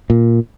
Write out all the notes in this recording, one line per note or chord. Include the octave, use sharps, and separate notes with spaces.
A#2